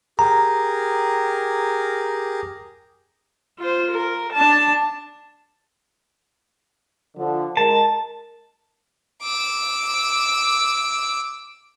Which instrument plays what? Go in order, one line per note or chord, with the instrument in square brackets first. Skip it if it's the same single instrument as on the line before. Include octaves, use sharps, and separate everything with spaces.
[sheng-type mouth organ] G4 G#4 A#4 [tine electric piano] A#5
[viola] F4 C5
A#4
D4 A5
[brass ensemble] D3 F3
[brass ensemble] G#3 A#4 [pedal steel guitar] A5
[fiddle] D6 E6